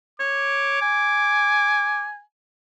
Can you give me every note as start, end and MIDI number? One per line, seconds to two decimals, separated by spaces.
0.20 0.77 73
0.20 2.07 86
0.82 2.21 80